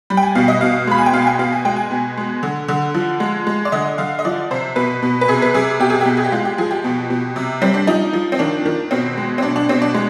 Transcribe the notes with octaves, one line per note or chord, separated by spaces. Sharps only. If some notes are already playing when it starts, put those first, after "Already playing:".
G3 B5
G5
G#5
B2 F5
D#5
B2 F5
G#3 B5
G#5
G5
B2 F5
G#5
G5
B2 F5
G#5
G#3 G5
G#5
B2
G#3
D3
D3
F3
G#3
G#3
D5
D3 D#5
D3 F5
D#5
F3 D5
C3 C5
B2 B4
B2
B4
C3 G#4
B4
C3 G#4
B2 G4
G#4
B2 G4
G#4
G4
G#3 F4
G4
F3 G#4
G4
B2
B2
C3
G3 C4
D4
F3 D#4
F3
C4
D#3 D4
D#3
B2 C4
G#3
C4
B2 D4
D4
B2 C4
D4
G#3